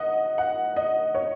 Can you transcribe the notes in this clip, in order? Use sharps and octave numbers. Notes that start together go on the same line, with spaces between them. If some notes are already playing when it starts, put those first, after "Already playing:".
Already playing: D#5 F#5
F#5
D#5
C#5